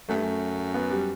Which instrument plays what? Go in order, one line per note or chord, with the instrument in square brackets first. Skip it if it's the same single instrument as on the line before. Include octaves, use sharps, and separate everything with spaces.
[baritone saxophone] F#2 [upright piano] A3
[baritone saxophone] G2
F#2
[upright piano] B3
G3